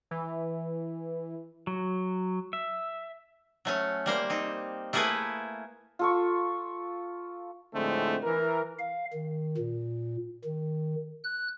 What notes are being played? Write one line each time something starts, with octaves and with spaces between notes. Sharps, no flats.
E3
F#3
E5
F#3 A3 C#4
G3 A#3 C5
C4 D#4
A3 A#3 E4 G#4 A4 B4
F4 A4 C#6
F2 A2 D3 G#3 A3 C4
E3 A#4
F5
D#3
A#2
D#3
F#6